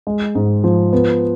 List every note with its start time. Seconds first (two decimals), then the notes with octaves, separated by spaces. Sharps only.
0.07 G#3
0.35 G#2
0.64 F3
0.93 B3